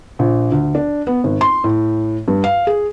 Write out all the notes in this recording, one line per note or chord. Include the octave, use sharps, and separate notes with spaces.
A#1
D2
D4
B3
G#1
C6
A2
G2
F5
G#4